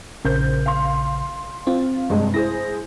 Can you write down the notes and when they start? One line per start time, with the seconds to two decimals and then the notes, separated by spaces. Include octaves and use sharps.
0.25 A#1 C#3 A#4 C5 G6
0.66 F5 C6
1.67 C4 F4
2.10 G2 C3 G#3
2.34 E4 G#4 C5 A#6